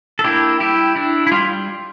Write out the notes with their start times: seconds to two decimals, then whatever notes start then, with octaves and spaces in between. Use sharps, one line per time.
0.19 A4
0.24 A#3 D4 E4 G4
0.60 G3 E4 G4
0.96 D4 E4
1.27 E4
1.32 G3 F4